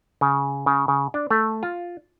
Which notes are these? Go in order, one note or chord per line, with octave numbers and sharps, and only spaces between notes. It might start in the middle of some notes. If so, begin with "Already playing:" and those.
C#3
C#3
C#3
D4
A3
F4